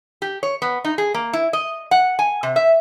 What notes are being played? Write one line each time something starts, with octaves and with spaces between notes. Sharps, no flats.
G4
C#5
B3
D#4
G#4
A#3
E4
D#5
F#5
G#5
C3
E5